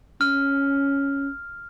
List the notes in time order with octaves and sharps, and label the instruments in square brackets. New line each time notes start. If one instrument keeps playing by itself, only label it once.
[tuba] C#4 [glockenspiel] F6